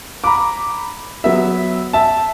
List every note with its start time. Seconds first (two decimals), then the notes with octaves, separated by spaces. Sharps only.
0.24 A#5 B5 D6
1.24 F#3 B3 E5
1.93 E5 A5